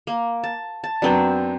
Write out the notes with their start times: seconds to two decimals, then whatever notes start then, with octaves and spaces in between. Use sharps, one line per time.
0.07 A#3
0.43 A5
0.84 A5
1.02 F#2 F#3 B3 C4 D4